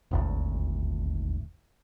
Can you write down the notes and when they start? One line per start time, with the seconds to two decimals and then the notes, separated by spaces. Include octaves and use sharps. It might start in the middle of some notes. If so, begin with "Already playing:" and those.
0.11 D#1 G#1 D2